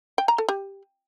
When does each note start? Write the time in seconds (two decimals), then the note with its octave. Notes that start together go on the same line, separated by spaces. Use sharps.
0.18 G5
0.28 A#5
0.38 A4
0.49 G4